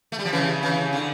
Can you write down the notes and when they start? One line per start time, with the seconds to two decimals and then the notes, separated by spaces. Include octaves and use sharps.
0.12 A3
0.19 G3
0.25 F3
0.33 C#3 E3
0.63 C#3 E3
0.93 D3